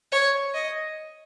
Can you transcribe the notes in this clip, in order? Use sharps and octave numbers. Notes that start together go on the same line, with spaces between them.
C#5
D#5